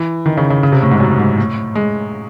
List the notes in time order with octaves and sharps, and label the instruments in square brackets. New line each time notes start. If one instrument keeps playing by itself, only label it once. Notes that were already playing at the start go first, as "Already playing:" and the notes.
Already playing: [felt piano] E3
D#3
C#3
C#3
C#3
C3
A2
G#2
F#2
G#2
A2
G#3